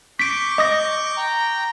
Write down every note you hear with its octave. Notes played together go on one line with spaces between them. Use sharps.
C#6 D6 G6 B6 D7
D#5 D#6 A#6
G5 A#5